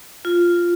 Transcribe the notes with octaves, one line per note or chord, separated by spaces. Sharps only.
F4